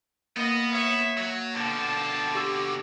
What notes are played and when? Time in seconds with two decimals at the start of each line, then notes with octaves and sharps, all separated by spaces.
0.37 A#3 B3 A#4 D#5
0.72 C#5 E5
1.18 F#3
1.55 B2 D3 F5 G5 A5
2.35 G4 C#6 E6